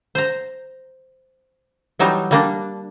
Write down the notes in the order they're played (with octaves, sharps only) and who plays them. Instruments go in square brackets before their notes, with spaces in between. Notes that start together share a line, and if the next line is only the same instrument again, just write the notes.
[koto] C5 A#5
E3 F#3 G3 D#4
G3 A#3 D4